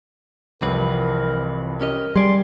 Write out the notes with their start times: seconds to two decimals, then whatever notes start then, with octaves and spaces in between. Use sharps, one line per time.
0.62 C2 F2 E3 C4 A#4 B4
1.81 C#4 G4 A#4 D#5
2.16 G3 G#4 D5 G#5 C6